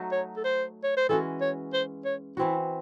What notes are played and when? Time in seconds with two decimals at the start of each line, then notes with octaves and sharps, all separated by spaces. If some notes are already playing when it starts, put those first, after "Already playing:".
Already playing: F#3 A3 D#4 F#4
0.12 C#5
0.37 A4
0.44 C5
0.84 C#5
0.97 C5
1.09 E3 G#3 C#4 F#4 A4
1.41 C#5
1.73 C5
2.05 C#5
2.37 E3 C4 E4 F#4